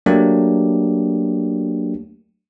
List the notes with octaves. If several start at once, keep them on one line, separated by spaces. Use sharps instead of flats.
F#3 A3 A#3 D4 G4